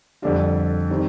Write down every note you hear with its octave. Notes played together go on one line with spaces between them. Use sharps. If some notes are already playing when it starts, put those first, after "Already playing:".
F2 D3 G3 D4 F4
D#3 G3 C4